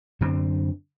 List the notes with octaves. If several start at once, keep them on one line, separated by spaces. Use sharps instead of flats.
F#2 D3 C4